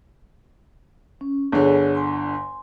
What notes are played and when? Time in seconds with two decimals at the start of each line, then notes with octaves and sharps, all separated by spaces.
1.21 C#4
1.52 G1 D3 G#4 C#5 G#5
1.95 G#5 C6